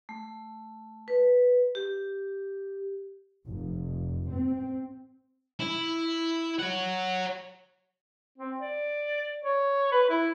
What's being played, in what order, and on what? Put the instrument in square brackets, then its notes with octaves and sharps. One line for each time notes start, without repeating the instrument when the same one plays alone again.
[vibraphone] A3
B4
G4
[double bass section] F1
C4
[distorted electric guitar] E4
C#5 F#5
[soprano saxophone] C4
D5
C#5
B4
E4